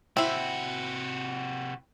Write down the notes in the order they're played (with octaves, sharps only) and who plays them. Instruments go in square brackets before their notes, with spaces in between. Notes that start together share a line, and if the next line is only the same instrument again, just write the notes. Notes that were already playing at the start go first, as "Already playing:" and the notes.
[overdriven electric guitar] C3 F#4 [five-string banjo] C4 E4